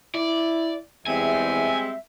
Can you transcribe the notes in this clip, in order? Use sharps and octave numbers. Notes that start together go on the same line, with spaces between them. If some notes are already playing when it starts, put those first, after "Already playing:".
E4 D5
E2 G3 G#3 C4 E5 G#5